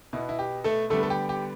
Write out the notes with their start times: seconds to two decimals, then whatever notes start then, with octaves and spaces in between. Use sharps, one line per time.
0.13 B2 B3 E4
0.29 E4
0.39 G4
0.64 A3 A4
0.90 D3 G3 A3 B3 A4
1.03 A4
1.10 G4
1.29 G4